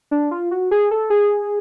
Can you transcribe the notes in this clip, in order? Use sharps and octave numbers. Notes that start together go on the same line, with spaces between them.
D4
F4
F#4
G#4
A4
G#4